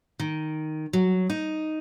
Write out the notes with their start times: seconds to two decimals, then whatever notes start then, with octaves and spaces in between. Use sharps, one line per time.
0.20 D#3
0.93 F#3
1.30 D#4